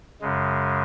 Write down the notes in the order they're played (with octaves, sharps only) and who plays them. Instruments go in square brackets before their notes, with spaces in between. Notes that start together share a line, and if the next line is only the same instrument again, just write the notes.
[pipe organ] F#2 C#3 G#3